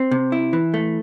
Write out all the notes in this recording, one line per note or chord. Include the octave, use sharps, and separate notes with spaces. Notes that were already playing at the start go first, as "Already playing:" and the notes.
Already playing: C4
C3
E4
E3
A3